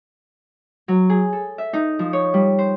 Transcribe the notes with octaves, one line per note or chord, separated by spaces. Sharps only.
F#3
G#4
A4
E5
D#4
F3
C#5
G3
C5